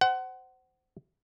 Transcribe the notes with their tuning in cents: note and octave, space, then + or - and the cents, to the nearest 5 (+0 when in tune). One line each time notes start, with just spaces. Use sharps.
C5 -10 F#5 +25